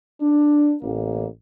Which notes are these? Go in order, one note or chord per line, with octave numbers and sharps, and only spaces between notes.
D4
A1 A#3